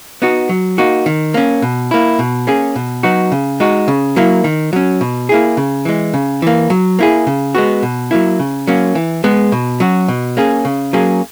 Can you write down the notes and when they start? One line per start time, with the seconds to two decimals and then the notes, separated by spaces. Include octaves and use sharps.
0.22 B3 D#4 F#4
0.49 F#3
0.78 A#3 D#4 F#4
1.06 D#3
1.34 A#3 C#4
1.62 B2
1.91 A#3 E4
2.19 B2
2.47 A#3 C#4 G#4
2.76 B2
3.03 F#3 B3 D#4 F#4
3.32 C#3
3.60 G#3 D#4 F#4
3.88 C#3
4.16 F#3 A#3 E4
4.44 D#3
4.73 F#3 C#4
5.01 B2
5.29 A#3 E4 G#4
5.57 C#3
5.85 E3 G#3
6.14 C#3
6.42 E3 A#3
6.70 F#3
6.99 A#3 E4 G#4
7.27 C#3
7.55 G#3 B3 F#4
7.83 B2
8.11 F#3 A#3 E4
8.40 C#3
8.67 F#3 A#3 C#4
8.95 E3
9.24 G#3 B3
9.52 B2
9.80 F#3 C#4 F#4
10.08 B2
10.37 A#3 C#4 G#4
10.65 C#3
10.93 F#3 A#3 C#4 G#4